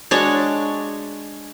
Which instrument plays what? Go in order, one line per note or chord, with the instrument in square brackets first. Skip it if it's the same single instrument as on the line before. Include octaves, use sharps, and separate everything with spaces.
[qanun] G#3 D4 F#4 C#5